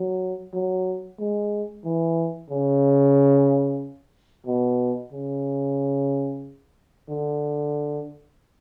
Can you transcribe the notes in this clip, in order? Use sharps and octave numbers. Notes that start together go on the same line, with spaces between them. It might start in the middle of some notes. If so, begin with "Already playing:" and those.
Already playing: F#3
F#3
G#3
E3
C#3
B2
C#3
D3